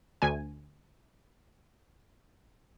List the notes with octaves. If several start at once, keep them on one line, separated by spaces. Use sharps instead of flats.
D2 G#5